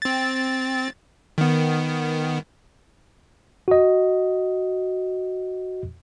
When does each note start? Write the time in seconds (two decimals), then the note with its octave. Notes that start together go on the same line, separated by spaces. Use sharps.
0.02 C4 A6
1.38 D#3 B3
3.68 F#4 D#5